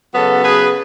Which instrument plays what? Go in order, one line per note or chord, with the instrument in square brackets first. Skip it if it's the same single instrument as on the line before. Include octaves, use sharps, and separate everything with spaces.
[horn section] C#3 F#3 B3 F#4 A4
G#4 B4